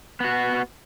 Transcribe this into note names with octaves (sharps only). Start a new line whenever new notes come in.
B3 F#4